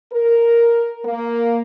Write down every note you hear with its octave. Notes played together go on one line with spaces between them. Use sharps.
A#4
A#3